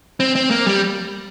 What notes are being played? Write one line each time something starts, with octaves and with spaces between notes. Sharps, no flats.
C4
C4
A#3
G3